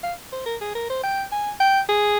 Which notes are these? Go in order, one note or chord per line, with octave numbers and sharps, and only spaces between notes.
F5
C5
A#4
G#4
A#4
C5
G5
G#5
G5
G#4